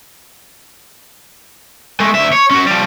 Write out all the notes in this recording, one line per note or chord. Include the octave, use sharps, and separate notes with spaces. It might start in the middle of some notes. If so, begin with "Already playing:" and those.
G#3 A3
D2 E5
C#5
C#4 F#4
F3 G3